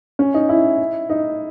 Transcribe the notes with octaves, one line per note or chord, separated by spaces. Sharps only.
C#4
D#4
E4
D#4